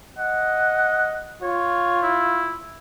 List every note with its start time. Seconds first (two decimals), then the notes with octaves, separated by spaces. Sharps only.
0.19 D#5 F#5
1.42 F4 C#5
2.02 E4